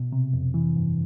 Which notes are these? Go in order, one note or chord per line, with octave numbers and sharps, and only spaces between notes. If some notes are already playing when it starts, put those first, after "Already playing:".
Already playing: B2
C3
F2
E3
G2